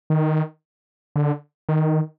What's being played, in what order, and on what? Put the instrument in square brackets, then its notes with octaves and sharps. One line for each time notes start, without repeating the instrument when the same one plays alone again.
[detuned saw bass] D#3
D3
D#3